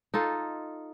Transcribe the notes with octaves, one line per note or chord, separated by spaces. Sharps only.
D#4 F4 A4